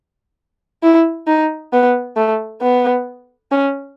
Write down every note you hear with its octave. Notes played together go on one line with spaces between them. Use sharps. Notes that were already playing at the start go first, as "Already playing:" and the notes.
E4
D#4
B3
A3
B3
C#4